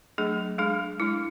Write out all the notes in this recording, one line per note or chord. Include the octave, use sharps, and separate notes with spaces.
F#3 A3 D4 G#4
G#3 D4 G#4
G#3 D4 E4